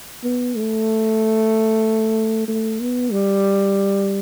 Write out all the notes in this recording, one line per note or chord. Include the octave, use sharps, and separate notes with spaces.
B3
A3
A3
B3
G3